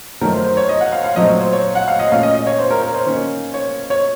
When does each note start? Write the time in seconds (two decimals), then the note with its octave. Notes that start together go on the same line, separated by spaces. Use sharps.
0.21 F#2 D#3 F#3 A3 A#4
0.33 C5
0.45 C5
0.57 C#5
0.69 D#5
0.81 F#5
0.92 F5
1.04 F5
1.16 A#2 F#3 A3 C4 D#4 D#5
1.28 C#5
1.40 C5
1.52 C#5
1.75 F#5
1.88 F5
1.99 D#5
2.12 A#2 A3 C#4 F5
2.23 D#5
2.35 D#5
2.47 C#5
2.59 C5
2.71 A#4
2.82 A#4
2.94 C5
3.06 D#3 A#3 C#4
3.54 C#5
3.90 C#5